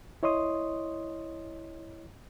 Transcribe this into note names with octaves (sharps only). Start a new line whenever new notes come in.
E4 C#5 D#5 C6 D#6